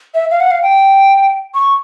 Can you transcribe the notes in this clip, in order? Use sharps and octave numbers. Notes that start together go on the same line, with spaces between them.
E5
F5
F#5
F5
G5
C#6